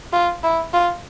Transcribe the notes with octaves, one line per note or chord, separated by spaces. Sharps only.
F4
E4
F4